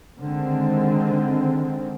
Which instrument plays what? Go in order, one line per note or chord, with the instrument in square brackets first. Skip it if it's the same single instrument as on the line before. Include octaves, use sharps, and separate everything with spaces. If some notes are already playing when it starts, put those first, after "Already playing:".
[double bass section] D3 D#3 G#3 C4